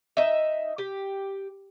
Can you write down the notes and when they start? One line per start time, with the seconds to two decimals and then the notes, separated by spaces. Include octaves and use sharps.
0.17 D#4 E5
0.78 G4